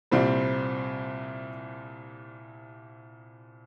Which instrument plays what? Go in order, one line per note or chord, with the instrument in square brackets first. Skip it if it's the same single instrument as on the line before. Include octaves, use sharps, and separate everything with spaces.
[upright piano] C2 A#2 G3 C4